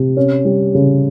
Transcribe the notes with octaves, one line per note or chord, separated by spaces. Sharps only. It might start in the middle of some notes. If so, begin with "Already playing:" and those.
Already playing: C3
C#4
G3
C#3